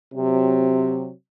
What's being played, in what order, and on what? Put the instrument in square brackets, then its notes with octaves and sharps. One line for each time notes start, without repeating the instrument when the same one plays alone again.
[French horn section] C3 F#3 C4